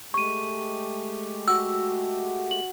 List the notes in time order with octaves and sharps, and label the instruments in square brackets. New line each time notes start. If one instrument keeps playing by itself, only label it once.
[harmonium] G#3 A3 G4 [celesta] C#6 D#7
[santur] F#4 [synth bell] E6
[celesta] F#7